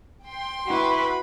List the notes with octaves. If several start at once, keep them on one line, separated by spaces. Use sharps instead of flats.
G5 C6
E4 F#4 B4 B5